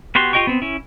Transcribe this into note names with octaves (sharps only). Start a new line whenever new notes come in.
B3 F#4 G4 C6
F4 G4 D#5 G5 C#6
B3 C4
C#4 E4